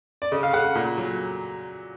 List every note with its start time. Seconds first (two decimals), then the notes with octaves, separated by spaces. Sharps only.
0.22 D5
0.31 C#3 D#5
0.43 F5
0.53 C#3 F#5
0.75 A#2
0.97 F#3